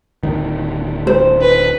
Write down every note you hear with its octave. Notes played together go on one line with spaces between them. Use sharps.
D1 D#3
C5
B4